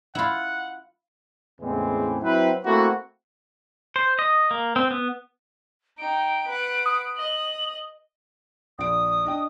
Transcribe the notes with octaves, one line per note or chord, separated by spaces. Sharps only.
E4 F4 F#5
E2 A2 C#3 E3 G#3 C4
F#3 C4 E4 B4
A3 A#3 C4 E4 F#4
C5
D#5
A#3
C4
B3
D#4 G5 D7
B4 F#5
D#6
D#5 F#7
A#1 D#6 D7
D4 D#5 G5